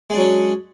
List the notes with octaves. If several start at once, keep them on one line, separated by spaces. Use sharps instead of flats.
F#3 G#3 C#4 D4